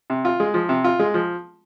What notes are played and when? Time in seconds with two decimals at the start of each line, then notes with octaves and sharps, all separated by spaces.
0.10 C3
0.25 F4
0.40 G#3
0.54 F3
0.69 C3
0.84 F4
0.99 G#3
1.14 F3